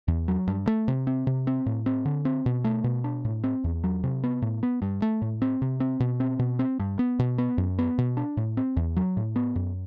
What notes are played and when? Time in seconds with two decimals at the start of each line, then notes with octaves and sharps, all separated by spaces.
0.08 E2
0.28 F#3
0.48 G2
0.67 A3
0.88 C3
1.07 C4
1.27 C3
1.47 C4
1.66 A2
1.86 C4
2.05 D3
2.25 C4
2.46 B2
2.64 A3
2.84 B2
3.04 D4
3.25 A2
3.44 C4
3.64 E2
3.84 F#3
4.04 C3
4.23 B3
4.42 A2
4.63 B3
4.82 G2
5.02 A3
5.22 A2
5.42 C4
5.62 C3
5.80 C4
6.00 B2
6.20 C4
6.39 B2
6.59 C4
6.80 G2
6.99 B3
7.19 B2
7.38 B3
7.58 F#2
7.78 B3
7.98 B2
8.17 D4
8.37 A2
8.57 C4
8.77 E2
8.96 F#3
9.17 A2
9.36 B3
9.56 F#2